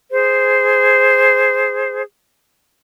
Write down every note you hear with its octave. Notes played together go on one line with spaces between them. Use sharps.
G#4 C5